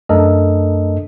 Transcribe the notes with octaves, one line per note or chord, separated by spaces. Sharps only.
F#2 A3 D4 A4 A#4 D#5